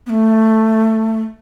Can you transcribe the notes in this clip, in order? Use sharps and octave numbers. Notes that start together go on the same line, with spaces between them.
B3
A3